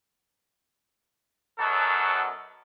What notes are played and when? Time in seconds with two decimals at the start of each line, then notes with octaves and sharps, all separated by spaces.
1.58 F#2 B2 F#3 A4